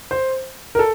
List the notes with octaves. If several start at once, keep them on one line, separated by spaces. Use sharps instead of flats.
C5
A#4
A4